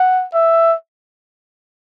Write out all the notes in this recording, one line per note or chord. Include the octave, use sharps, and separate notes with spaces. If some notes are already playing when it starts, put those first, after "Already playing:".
Already playing: F#5
E5